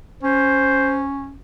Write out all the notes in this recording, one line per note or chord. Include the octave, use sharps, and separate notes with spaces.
C#4 C5